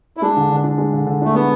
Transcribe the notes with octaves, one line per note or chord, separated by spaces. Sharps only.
E4
G#3 D4
D3
D3
D4
G#3
D3
D3
A3 D4
G#3 B3